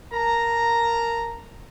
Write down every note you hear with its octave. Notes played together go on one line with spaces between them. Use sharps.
A#4 A5 A#5